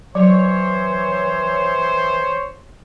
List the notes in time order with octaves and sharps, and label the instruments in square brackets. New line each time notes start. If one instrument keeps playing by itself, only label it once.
[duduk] E3 [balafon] F#3 [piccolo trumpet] C5 [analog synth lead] C#5